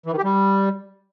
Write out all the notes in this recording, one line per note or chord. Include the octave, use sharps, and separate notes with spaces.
E3
D#3
G4
G3